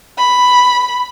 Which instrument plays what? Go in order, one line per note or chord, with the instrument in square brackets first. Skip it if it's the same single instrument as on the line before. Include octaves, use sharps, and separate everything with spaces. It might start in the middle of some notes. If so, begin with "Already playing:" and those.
[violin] B5